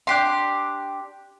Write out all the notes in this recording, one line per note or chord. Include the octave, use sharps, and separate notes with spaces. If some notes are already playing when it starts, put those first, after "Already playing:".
D4 G4 C6